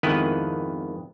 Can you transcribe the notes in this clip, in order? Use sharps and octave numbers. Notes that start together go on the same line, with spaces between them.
G#1 F2 D#3 B3 E4 B4